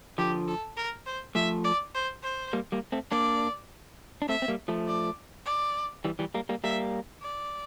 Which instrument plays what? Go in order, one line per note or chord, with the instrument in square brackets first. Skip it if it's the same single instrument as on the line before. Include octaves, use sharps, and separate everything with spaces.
[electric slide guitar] D3 F3 [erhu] G4
[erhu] A4
A#4
C5
[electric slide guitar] F3 A3 [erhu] E5
[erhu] D5
C5
C5
[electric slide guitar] G3 A#3
G3 A#3
A3 C4
[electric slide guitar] A#3 D4 [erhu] D5
[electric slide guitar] D4
[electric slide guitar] A3 C4 [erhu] E5
[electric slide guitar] C4
G3 A#3
F3 A3
[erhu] D5
D5
[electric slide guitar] E3 G3
E3 G3
G3 A#3
G3 A#3
[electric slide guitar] G3 A#3 [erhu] E5
[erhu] D5